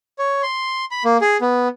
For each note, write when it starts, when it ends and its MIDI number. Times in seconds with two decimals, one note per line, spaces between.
0.19 0.42 73
0.43 0.85 84
0.91 1.03 83
1.05 1.17 58
1.21 1.37 68
1.41 1.68 59